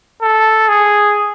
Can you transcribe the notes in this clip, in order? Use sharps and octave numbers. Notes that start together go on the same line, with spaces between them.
A4
G#4